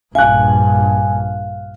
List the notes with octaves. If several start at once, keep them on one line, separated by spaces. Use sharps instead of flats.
A#1 G2 F5 G#5 F#6